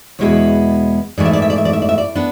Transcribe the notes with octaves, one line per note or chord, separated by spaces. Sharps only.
E2 B2 G#3 B3 E4 C#5
G#2 E3 A3 D5
E5
D5
E5
D5
E5
D5
E5
D5
E5
D5
B3 D4 B4